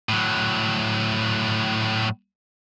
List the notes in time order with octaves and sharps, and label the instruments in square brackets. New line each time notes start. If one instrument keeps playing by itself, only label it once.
[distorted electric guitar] A2 F#3